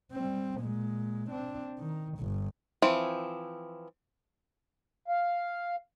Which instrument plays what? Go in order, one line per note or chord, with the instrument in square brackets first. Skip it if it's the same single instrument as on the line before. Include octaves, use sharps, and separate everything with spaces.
[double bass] G3 C4
A#2 G#3
C4 D4
D#3
G1 G2
[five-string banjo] E3 F3 C4
[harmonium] F5